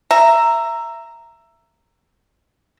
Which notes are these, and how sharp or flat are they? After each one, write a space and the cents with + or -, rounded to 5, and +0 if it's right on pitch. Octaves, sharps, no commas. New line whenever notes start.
E5 +15 A#5 -5